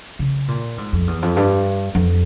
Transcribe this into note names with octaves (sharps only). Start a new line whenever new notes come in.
C#3
A#2
G#2
F2
E2
F2
G2
F2